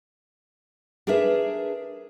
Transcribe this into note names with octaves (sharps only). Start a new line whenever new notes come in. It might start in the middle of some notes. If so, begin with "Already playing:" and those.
D4 G#4 A#4 B4 E5